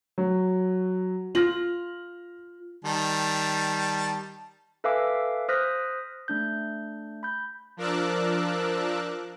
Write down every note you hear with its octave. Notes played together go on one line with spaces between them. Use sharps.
F#3
F4 F6 A#6 F#7
D#3 G3 A5
A4 B4 E5 F5 G#5 D6
C5 D#6 F6 F#6 A#6 B6
A3 D4 G6
B5 G6
F3 D4 A#4 D6 E6 F#6